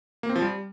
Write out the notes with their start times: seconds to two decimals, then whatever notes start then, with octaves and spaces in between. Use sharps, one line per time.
0.23 A#3
0.29 C4
0.36 F3
0.42 G3